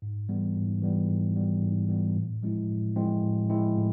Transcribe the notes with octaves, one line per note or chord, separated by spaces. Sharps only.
G#2
E3 G3 B3
G#2
E3 G3 B3
G#2
E3 G3 B3
G#2
E3 G3 B3
A2
F3 G#3 C4 E4
A2
F3 G#3 C4 E4
A2
F3 G#3 C4 E4
A2